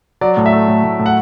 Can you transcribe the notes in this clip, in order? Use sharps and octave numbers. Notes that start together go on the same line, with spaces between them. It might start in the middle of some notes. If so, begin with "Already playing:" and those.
F#3 D5
A2
E5
A3
A2
A2
A2
F#5